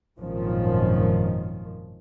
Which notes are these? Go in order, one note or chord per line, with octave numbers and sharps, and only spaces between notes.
G#1 F#2 A#2 D#3 F3 C#4